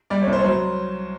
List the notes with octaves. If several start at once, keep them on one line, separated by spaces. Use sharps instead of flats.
G3 D5
C#5
C2
C5
C#5
F#3 C5